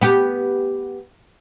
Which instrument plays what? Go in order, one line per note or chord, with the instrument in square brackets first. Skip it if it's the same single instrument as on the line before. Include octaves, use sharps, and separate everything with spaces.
[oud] B3 G4